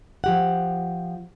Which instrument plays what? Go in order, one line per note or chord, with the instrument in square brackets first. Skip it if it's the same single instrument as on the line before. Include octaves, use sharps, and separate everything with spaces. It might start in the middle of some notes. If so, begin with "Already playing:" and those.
[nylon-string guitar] F3 G4 F#5